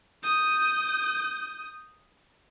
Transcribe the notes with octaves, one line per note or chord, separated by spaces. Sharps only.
D#6 G6